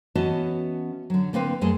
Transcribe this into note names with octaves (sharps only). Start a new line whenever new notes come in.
E3 B3 C#4 F#4 D#5 A5
D3 F#3
D3 A#3 C4 B4 F5
F#2 G#3 A3 G#4 A5